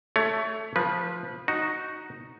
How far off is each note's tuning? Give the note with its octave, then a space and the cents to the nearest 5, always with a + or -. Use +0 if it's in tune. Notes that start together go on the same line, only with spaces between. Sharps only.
A3 +0 C#5 +25
F3 +5 B4 -25
D#4 +0 F#4 +0